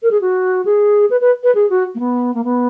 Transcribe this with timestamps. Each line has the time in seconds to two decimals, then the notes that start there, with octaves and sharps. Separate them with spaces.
0.03 A#4
0.11 G#4
0.21 F#4
0.65 G#4
1.10 B4
1.21 B4
1.43 B4
1.55 G#4
1.70 F#4
1.95 A#3
1.99 B3
2.34 A#3
2.44 B3